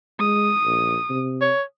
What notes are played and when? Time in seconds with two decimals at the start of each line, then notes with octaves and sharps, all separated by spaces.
0.20 G#3 D#6
0.66 A#1
1.10 C3
1.42 C#5